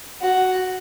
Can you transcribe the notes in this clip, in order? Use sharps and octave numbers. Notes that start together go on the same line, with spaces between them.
F#4